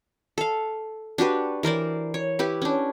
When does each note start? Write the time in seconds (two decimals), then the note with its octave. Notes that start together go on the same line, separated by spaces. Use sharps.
0.38 A4 F5
1.18 D4 F#4 G4 B4
1.63 E3 A#4 C5 D5
2.14 C#5
2.39 E4 G4 B4
2.62 C#4 D4